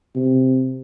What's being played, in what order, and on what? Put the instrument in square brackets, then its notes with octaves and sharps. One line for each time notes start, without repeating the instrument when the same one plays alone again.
[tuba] C3